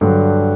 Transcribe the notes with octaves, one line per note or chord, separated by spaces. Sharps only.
G2 D3 F#3